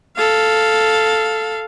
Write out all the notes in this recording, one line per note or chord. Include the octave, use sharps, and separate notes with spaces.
A4 F5